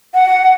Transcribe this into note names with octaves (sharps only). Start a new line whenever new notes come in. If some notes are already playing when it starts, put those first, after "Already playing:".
F#5